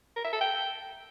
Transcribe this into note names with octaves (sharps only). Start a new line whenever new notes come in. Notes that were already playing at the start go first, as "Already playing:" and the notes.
A#4
E5
A4
G5